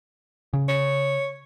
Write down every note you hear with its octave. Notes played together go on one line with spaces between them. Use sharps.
C#3
C#5